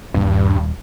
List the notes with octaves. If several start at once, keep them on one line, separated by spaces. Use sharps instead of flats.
D#1 G2